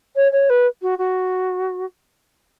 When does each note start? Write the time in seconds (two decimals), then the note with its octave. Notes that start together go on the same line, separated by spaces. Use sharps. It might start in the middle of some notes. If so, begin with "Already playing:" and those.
0.16 C#5
0.32 C#5
0.49 B4
0.82 F#4
0.98 F#4